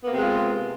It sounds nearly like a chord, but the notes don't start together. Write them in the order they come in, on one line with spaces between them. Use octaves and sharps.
B3 A#3 C3 G#3 F4